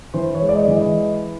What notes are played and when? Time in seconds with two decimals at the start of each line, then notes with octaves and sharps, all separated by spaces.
0.14 E3 C5
0.35 C#5
0.41 G#3
0.49 D5
0.55 D#5
0.68 E3
0.75 D#5